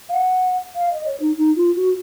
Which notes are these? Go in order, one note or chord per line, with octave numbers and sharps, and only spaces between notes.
F5
F#5
F5
D#5
C#5
D#4
D#4
F4
F#4